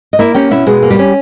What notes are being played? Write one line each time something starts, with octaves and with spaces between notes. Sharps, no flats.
D#5
A#3 E4 E5
C#4 G4 G5
B2 E4 E5
B2 G#3 G#4
A#3
G3 G4
C#4